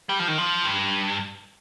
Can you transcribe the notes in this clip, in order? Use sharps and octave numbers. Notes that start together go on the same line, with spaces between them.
G3
F3
D#3
F3
G2